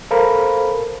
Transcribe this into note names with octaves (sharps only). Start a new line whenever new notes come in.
A4 A#4 C5 F5 B5